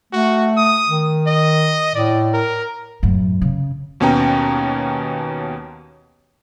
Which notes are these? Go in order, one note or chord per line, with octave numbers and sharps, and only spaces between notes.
A3 F#4
D#6
D#3
D#5
A2 D5
A#4
F#2 A2
C#3
D#2 B2 C#4 C#5 G5 A#5